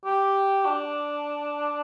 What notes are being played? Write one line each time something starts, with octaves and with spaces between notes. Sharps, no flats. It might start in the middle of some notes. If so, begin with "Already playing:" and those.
G4
D4